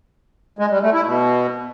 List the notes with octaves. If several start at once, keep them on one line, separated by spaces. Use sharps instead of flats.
G#3
G3
A3
E4
B2